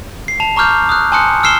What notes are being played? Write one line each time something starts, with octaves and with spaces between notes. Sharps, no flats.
C7
A5 F7
A#5 C#6 D6 F6 G6 F7
D#6 F6 F#6
G#5 A5 C6 D#6 F#6 C#7
E6 F6 C7 E7 G7